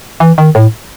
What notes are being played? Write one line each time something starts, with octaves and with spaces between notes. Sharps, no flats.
E3
D#3
A2